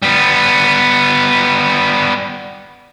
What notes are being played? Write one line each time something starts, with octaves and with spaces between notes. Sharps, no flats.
G3 B3